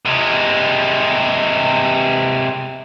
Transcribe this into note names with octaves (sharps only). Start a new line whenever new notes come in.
C3 G#3